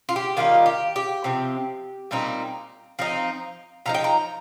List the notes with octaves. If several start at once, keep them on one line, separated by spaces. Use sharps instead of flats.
F4
G4
D#3 G3 A#3 D#4 F4
G4
G4
C3 F3 C4
A#2 G3 C4 D#4
F3 C4 D#4
C3 F3 D#4 A#5
G5
A#5